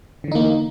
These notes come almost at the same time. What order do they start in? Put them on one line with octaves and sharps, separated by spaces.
D3 E3 D#4 A#3